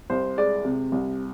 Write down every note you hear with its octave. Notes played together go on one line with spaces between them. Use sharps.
C2 C5
G#3 D5
C3
C2